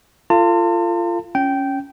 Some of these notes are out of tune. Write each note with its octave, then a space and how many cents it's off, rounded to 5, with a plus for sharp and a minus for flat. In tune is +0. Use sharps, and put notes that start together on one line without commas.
F4 -20 A4 +20 A5 +40
C#4 +0 G5 -15